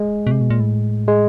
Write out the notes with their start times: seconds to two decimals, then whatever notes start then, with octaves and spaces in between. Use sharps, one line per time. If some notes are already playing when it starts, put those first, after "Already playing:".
Already playing: G#3
0.27 B2
0.31 C3
0.41 B2
0.50 A#2
0.60 A2
1.08 G#3